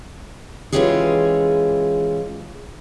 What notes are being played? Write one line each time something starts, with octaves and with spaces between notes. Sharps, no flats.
E3 G#3 C#4 F4 G4 G#4